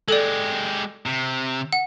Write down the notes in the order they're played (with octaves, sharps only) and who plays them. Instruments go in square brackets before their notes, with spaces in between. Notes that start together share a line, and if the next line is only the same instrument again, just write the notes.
[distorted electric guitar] G#3 G4 [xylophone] A4 D5
[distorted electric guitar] C3
[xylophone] F#5